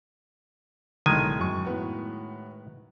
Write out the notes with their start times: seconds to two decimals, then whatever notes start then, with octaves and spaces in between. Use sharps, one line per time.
1.06 B1 A2 D3 D#3 G#3 G#5
1.39 F#2 C#6
1.65 A2 B3 F#4